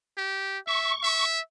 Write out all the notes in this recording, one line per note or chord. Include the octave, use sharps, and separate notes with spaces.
G4
E5 C#6
E5